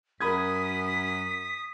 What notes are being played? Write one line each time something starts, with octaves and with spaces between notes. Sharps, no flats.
F#2 A#4 B5 D#6 G#6 B6